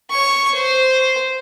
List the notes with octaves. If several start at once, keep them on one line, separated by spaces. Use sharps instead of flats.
C#5 C#6
C5